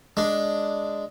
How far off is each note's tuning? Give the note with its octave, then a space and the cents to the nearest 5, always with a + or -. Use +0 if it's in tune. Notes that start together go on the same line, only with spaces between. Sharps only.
G#3 +0 D4 +0